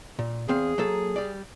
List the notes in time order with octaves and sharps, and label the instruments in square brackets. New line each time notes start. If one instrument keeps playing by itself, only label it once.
[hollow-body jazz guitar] A#2
[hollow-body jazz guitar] E2 C4 F5 [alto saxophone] G#4
[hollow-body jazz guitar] F#3 A#3 A4
G3 D5